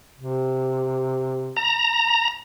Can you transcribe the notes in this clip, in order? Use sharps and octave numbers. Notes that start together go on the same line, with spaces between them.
C3
A#5